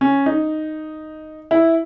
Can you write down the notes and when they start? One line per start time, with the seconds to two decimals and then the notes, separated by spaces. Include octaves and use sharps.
0.01 C#4
0.26 D#4
1.51 E4